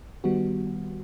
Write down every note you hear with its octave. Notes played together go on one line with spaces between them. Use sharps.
D#3 G3 B3 F#4